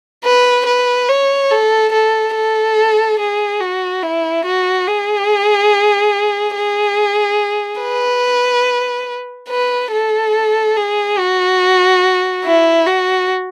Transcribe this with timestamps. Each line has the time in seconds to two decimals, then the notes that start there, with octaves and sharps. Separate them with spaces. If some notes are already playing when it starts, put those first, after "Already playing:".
0.24 B4
0.66 B4
1.09 C#5
1.51 A4
1.92 A4
2.35 A4
3.19 G#4
3.60 F#4
4.03 E4
4.45 F#4
4.87 G#4
6.56 G#4
7.81 B4
9.49 B4
9.92 A4
10.76 G#4
11.18 F#4
12.45 E4
12.86 F#4